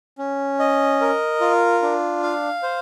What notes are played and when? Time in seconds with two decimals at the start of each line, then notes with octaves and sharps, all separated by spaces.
0.18 C#4
0.59 D#5
1.01 A#4
1.41 F4
1.82 D4
2.23 F5
2.63 C5